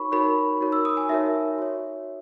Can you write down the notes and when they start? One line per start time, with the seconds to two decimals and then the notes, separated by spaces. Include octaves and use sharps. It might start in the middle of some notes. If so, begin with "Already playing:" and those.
Already playing: D#4 F#4 A#4 C#5 B5 C#6
0.12 D#4 F#4 A#4 C#5 B5
0.61 D#4 F#4 A#4 C#5
0.72 E6
0.85 D#6
0.97 G#5
1.09 D#4 F#4 A#4 C#5 E5
1.58 F#4 C#5